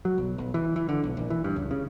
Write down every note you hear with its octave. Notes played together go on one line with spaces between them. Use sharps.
F#3
B1
B1
E3
E3
D3
B1
A#1
E3
G2
C#2
C#3